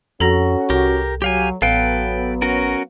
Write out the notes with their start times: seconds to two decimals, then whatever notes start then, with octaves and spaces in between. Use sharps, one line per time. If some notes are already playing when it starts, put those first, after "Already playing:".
0.20 F2 C#4 F#4 A4 A#5 A#6
0.70 C2 G4 A#4
1.22 F#3 G4 F5 G#5
1.62 A1 F#3 B3 A4 B4 F5 G5
2.42 C#4 F#4 A#4